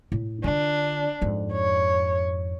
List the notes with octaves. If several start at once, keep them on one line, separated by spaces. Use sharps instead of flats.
A2
D3 D4 F4
F2 G#2
C#5